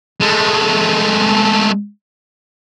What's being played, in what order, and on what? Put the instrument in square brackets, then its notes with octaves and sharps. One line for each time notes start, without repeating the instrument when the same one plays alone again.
[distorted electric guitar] G#3 A3